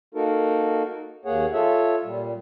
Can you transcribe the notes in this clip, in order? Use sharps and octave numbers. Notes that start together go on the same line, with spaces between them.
A#3 D#4 F#4 A4 A#4
D#2 A#3 G#4 C#5 F#5
F4 A4 C#5 E5
A#2 G3